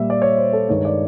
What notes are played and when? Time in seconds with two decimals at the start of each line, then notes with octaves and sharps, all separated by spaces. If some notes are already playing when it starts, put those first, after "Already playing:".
Already playing: A#2 G3 E5
0.10 D5
0.22 C#5
0.38 C5
0.53 A4
0.69 G2 D#3 G#3 C#5
0.85 D5